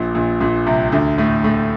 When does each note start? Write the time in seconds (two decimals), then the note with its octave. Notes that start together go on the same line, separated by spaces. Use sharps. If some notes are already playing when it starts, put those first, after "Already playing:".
Already playing: A#1 A#2
0.15 A#1 A#2
0.40 A#1 A#2
0.66 C2 C3
0.92 D2 D3
1.18 A2 A3
1.44 A2 A3